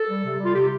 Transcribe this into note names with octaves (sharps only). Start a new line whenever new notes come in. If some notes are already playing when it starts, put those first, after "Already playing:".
Already playing: A4
G3
C3
G3
F4
C3 G4